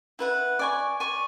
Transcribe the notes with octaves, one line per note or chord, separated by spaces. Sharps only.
E4 B4 F#5
D5 G#5 C#6
D5 G#5 C#6